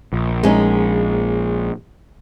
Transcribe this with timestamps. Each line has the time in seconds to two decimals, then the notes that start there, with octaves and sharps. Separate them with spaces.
0.13 A#1
0.43 G#3 C#4 D#4